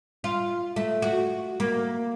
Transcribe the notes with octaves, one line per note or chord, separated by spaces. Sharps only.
F4
A3
F#4
A#3